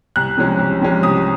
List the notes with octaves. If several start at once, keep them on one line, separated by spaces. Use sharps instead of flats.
C2 F#6
C3 F3 G#3 C#4
C2
C3 F3 G#3 C#4
C2 D#6